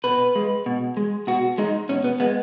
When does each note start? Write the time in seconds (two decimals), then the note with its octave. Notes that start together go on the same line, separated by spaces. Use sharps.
0.04 B2 B4
0.35 G#3
0.66 B2
0.97 G#3
1.27 B2 F#4
1.58 G#3 D#4
1.89 B2 C#4
2.04 B3
2.20 G#3 B3